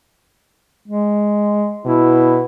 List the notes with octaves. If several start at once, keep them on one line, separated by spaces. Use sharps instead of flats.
G#3
B2 E4